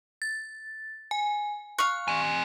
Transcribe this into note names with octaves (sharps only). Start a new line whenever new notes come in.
A6
G#5
F5 C#6 F#6
C4 G#5